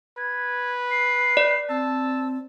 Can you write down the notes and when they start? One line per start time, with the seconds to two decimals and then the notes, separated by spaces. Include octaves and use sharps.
0.18 B4 G#6
0.91 C7
1.37 D5
1.69 C4 A5 E6